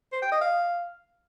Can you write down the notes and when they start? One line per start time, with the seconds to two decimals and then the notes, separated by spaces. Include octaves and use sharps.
0.12 C5
0.22 G5
0.32 D#5
0.41 F5